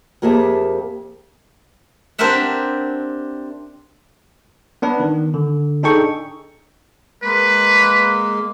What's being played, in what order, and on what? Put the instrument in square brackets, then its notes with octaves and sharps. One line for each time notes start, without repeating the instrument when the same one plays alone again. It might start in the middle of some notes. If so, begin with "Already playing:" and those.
[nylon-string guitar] F2 A#3 G4 G#4 E5 A5
[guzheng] C4 D4 G4 A#4 E5 F#5
[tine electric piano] B3 D4 B4
D#3
D3
D4 D#4 G#4 A4 G5 C#6
[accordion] G#3 A#3 [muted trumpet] B4